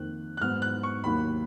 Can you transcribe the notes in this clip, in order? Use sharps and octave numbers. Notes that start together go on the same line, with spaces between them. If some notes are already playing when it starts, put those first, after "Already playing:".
Already playing: F2 D#3 A#3 F#6
F#6
G#2 F#3 B3 F6
F#6
C#6
D#2 D#3 F#3 A#3 B5